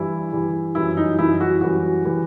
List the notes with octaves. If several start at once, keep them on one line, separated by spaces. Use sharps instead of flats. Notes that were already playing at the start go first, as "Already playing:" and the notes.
Already playing: G2 E3 G3 E4
G2 E3 G3
F#2 E3 G3 E4
D#4
F#2 E3 G3 E4
F#4
F#2 E3 G3 F#4
E3 G3